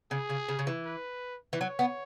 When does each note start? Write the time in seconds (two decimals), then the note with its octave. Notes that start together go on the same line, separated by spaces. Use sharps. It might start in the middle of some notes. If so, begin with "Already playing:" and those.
0.11 C#3 G#4
0.30 C#3
0.49 C#3
0.59 C#3
0.67 E3
0.86 B4
1.53 E3
1.61 F#3 C#5
1.79 B3